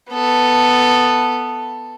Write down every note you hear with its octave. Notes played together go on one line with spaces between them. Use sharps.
B3 A4